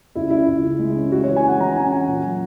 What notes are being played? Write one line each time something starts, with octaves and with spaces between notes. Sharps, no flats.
C#2 E4
C#3 E4
C#2
C#3
G#3
C#4
G#3 F#4
E3 C#5
G#5
G#3 F#5
E3 A#5
C#4 G#5
C#4 F#5
A#2
F#3